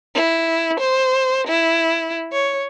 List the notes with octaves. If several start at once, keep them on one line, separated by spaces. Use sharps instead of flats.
E4
C5
E4
C#5